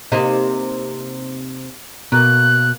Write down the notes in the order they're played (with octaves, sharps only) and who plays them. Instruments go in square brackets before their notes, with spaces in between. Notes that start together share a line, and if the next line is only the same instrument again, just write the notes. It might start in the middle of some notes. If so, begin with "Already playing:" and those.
[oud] C3 A#3 D#4
[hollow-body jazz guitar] B2 [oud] A#3 [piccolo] F#6